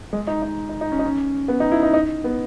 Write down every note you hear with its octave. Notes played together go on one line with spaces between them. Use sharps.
G#3
D#4
D#4
D#4
D#4
C#4
D#4
C#4
B3
D#4
E4
D#4
D#4
B3